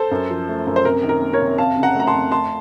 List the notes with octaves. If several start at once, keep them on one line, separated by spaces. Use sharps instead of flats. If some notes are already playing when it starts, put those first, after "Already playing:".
Already playing: A4 C5
F#2
F3
A3
F#2
C5
C3 A#4
D#3
A#4
A#3
A#4 C#5
C3
F2 F5 A5
C#3
F#5 A#5
A3 A#5
A5 C6
F2
A3 A5 C6